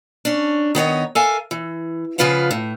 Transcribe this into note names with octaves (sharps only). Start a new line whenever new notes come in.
C#4 D4
D#3 B3 C#5 D#5
A4 A#4 E5 F5 G#5
E3
C#3 F3 F4 B4 F5 F#5
A2